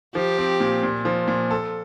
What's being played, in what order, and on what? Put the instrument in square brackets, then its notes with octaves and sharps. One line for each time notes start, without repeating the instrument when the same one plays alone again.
[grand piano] F3 [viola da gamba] G4
[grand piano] C4
A#2
A#2
F3
A#2
A4